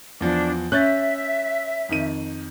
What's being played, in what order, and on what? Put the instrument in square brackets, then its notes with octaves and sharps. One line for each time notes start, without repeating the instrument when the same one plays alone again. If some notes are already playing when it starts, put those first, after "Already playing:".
[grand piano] E2 F3 [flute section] D4
[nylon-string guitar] C#4 [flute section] E5 [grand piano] F#6 G6 A6
[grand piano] F2 D#3 D#7